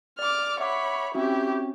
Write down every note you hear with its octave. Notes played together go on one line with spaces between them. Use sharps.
D5 D6 F6
C#5 E5 F#5 B5 D6
C4 C#4 E4 F#4 G4